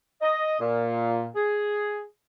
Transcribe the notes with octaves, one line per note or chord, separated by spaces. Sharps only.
D#5
A#2
G#4